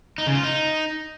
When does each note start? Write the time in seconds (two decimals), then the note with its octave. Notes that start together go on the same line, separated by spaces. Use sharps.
0.18 D#4
0.27 C#3
0.35 F4
0.43 D#4